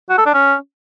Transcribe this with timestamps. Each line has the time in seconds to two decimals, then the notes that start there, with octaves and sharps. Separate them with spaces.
0.10 F#4
0.18 A4
0.26 D4
0.34 C#4